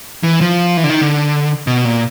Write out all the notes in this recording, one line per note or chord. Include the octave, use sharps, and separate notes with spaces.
E3
F3
E3
D3
D#3
D3
B2
A#2